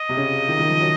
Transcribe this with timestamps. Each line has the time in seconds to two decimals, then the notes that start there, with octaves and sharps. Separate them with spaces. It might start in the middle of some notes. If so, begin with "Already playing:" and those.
Already playing: D#5
0.09 C3
0.17 C#3
0.48 D#3
0.59 D#3
0.69 F3
0.80 F#3